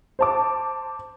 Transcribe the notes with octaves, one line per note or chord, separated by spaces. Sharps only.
C5 A5 D6